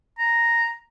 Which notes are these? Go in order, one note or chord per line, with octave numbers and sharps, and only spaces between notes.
A#5